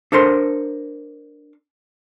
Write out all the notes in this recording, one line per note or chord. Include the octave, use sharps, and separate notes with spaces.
D4 A4 A#4 C5 C6